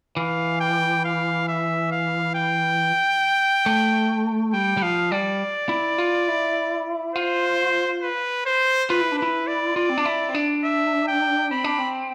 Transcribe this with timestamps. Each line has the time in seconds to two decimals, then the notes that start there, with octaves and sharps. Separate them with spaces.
0.17 E3 F5
0.60 G5
1.04 F5
1.48 E5
1.92 F5
2.35 G5
3.66 A3
4.53 G3 G5
4.77 G3
4.82 F3 F5
5.11 G3 D5
5.69 E4
5.98 F4
6.28 E4
7.15 F4 C5
8.02 B4
8.46 C5
8.90 F4 B4
9.01 E4
9.12 D4
9.18 E4 B4
9.47 D5
9.76 F4 D5
9.90 C4
9.98 D4
10.05 E4
10.29 C4
10.34 D4
10.64 E5
11.08 G5
11.51 C4 B5
11.64 D4
11.78 C4